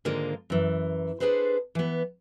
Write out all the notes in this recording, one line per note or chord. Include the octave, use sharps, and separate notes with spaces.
G#2 D3 D#3 G#3 A#3 F4
F#2 E3
D4 G#4 A4 B4 C5
E3 B3